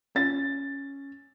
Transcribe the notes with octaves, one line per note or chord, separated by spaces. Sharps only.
C#4 A6